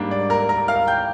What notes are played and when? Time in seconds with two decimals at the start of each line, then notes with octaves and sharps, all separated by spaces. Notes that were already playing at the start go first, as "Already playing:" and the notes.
Already playing: G#2 G3 A#3 D4
0.11 D5
0.30 A#4 A#5
0.49 A#4 A#5
0.68 F5 F6
0.87 G5 G6